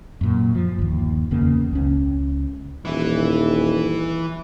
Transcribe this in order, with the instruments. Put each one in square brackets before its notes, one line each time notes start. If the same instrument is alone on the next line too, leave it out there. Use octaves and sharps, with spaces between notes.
[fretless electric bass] F#2 A#2
F3
G1 D#2
F#1 E2 C#3 A#3
C#2 C#4
[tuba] D#1 [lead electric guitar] E3 E4